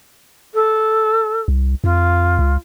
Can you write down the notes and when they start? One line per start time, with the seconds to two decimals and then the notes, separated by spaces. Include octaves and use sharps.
0.54 A4
1.48 C2
1.84 F2 F4
2.39 C#2